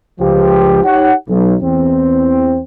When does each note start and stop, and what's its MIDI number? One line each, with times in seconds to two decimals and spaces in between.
0.20 0.81 37
0.20 0.81 53
0.20 0.81 67
0.84 1.12 63
0.84 1.12 67
0.84 1.12 73
0.84 1.12 78
1.29 1.55 35
1.62 2.59 40
1.62 2.59 60